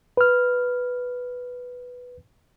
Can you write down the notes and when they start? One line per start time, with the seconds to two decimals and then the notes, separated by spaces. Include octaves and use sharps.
0.17 B4 F6